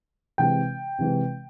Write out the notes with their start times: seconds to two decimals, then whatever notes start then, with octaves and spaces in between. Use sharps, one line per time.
0.38 C3 E3 G#3 G5
0.99 C3 E3 G#3